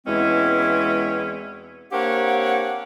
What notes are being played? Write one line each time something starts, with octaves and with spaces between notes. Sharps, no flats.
E2 B2 G#3 C4 C#4 E4
A#3 C4 D4 G4 C#5 F#5